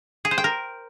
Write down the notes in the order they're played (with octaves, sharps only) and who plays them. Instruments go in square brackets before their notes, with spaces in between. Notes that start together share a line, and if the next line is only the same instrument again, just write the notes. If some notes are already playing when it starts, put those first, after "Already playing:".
[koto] G#4
C5
G5
A#4